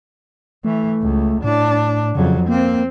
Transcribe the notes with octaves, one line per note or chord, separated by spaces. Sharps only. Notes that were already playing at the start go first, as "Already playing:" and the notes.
E3 A3
C#2
A2 D4
F2 C#3 F#3
A#3 C4